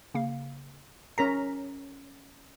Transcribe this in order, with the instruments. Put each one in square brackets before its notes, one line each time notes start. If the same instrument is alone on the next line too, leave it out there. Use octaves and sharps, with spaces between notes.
[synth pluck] C#3 A#3 F5
[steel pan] C#4 A#4 A#5 [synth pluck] B6